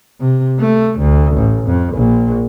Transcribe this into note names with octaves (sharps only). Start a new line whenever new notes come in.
C3
A3
D2
A1
F2
A#1